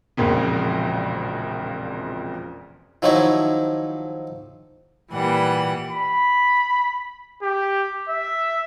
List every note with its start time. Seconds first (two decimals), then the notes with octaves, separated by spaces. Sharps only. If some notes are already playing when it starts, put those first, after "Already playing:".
0.17 E1 A#1 F2 A#2 C#3
3.02 D#3 F3 F#3 D#4 E4 C#5
5.12 A#2 E3 G3 F#5
5.90 B5
7.43 G4
8.09 E5